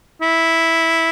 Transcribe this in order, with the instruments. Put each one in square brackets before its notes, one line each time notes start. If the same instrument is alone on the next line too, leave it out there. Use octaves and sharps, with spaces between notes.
[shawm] E4